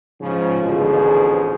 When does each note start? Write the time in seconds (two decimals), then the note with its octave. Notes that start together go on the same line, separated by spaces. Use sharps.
0.21 G#2 C#3 F3
0.63 A1 D2 G#2 B2 F3 G#4